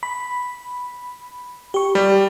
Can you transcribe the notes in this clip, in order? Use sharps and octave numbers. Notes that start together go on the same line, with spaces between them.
B5
G4 C#6
G3 G4